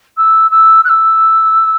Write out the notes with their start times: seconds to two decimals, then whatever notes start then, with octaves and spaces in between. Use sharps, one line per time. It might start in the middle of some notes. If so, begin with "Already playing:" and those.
0.17 E6
0.51 E6
0.85 F#6
0.89 E6